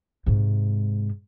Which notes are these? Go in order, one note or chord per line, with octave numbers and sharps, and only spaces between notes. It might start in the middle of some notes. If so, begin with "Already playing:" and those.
G#2 C3